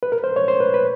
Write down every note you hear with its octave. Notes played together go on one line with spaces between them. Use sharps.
B4
A#4
C5
C#5
C5
B4
B4